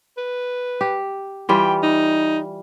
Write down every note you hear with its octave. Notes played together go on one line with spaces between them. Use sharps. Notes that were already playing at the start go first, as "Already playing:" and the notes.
B4
G4
E3 G3 F4 G5
D#4